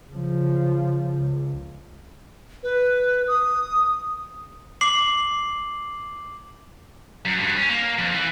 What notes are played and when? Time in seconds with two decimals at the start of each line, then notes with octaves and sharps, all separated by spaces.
0.11 C#3 F3
1.18 C#2
2.63 B4
3.28 D#6
4.81 D6 C7 F#7
7.25 F#2
7.40 G2
7.57 C#4
7.69 A#3
7.98 F2
8.14 E3